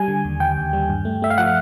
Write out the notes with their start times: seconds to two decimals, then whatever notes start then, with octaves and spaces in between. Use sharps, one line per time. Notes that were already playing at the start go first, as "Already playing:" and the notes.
Already playing: G3 G#5
0.08 D3
0.25 D#2
0.40 D#2 G5
0.57 D#2
0.73 G3
0.89 G2
1.05 A3
1.22 A3 E5
1.30 F5
1.38 F3 F#5